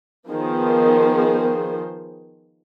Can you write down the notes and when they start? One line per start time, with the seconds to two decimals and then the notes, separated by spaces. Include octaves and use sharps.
0.29 D#3 F3 B3 G#4 C5